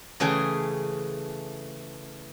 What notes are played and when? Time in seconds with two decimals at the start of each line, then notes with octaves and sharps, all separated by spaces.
0.20 C#3 E3 A3 G#4 G5